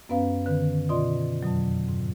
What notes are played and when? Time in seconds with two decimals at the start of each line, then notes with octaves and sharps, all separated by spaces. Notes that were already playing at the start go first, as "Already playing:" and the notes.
0.09 F#2 B3 C#4 B4 F5
0.46 D3 D#3 B4
0.89 B2 F4 D5 D#5 C6
1.43 F2 B2 F#3
1.88 G#2